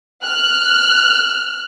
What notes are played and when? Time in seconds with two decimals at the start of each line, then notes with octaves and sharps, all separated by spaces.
0.23 F6 F#6